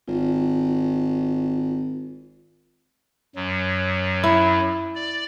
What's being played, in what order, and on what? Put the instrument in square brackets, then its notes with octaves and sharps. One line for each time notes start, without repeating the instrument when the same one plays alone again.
[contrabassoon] G#1 [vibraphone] F4
[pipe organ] F#2 F#3
[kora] E4
[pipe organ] D5